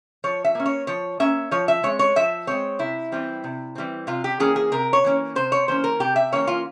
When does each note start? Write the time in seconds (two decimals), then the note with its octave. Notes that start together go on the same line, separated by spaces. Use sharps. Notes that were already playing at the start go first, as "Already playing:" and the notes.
0.24 F3 C#5
0.44 E5
0.55 A#3 C#4
0.65 C#5
0.87 F3 C#5
1.20 A#3 C#4 E5
1.51 F3 C#5
1.68 E5
1.83 G#3 C4 C#5
1.99 C#5
2.16 F3 E5
2.47 G#3 C4 C#5
2.79 C3 E4
3.12 E3 G3 C4
3.44 C3
3.75 E3 G3 C4
4.07 C3 F4
4.24 G4
4.40 E3 A#3 C#4 G#4
4.56 G#4
4.72 C3 A#4
4.93 C#5
5.04 E3 A#3 C#4
5.35 C3 C5
5.52 C#5
5.68 E3 A#3 C#4 C5
5.84 A#4
6.00 C3 G4
6.16 E5
6.32 E3 A#3 C#4 C#5
6.47 F4